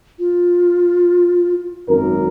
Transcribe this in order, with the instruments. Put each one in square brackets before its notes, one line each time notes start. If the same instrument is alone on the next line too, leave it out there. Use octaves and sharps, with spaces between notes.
[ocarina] F4
[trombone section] G#1 F#2 A#4